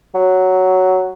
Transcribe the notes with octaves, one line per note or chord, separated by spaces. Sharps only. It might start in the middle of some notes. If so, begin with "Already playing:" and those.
F#3